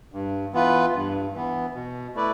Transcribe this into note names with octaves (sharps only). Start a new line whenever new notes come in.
G2
E3 B3 F4 B4
G2
E3 B3
B2
A3 E4 B4 D5